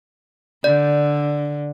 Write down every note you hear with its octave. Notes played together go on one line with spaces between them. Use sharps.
D3 D5